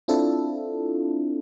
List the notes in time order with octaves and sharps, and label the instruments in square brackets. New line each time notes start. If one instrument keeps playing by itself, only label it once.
[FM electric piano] C4 D4 E4 F4 A4